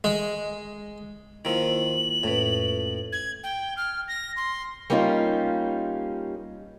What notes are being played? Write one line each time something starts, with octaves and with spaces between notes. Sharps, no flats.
G#3
D#3 F3 A#3 E4 F4 F#7
F2 A2 C#4 B4
G#6
G5
F6
A#6
C6
G3 A#3 C#4 D#4 F4